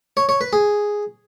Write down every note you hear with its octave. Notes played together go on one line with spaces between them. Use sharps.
C#5
C#5
B4
G#4